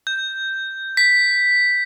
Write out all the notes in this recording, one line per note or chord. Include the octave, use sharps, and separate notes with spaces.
G6
B6